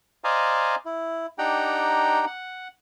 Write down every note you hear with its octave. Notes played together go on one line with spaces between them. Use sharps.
C5 D5 D#5 F5 G#5 A#5
E4
D4 D#4 G4 F#5 G5 A#5
F#5